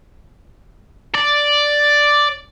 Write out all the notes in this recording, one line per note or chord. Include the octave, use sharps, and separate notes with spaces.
D5